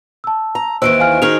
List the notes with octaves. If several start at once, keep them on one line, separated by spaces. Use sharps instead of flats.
A5 E6
A#5
D#2 D#3 E3 C5 E6 D7
F5 G#5 F6
D#3 D#4 F#4 G#4 F6 F7